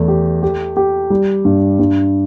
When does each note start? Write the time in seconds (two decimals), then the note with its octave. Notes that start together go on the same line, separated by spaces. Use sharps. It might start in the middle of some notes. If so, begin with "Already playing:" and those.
Already playing: E2 A3
0.08 G4
0.43 G4
0.77 G4
1.10 G3
1.45 G2
1.79 G2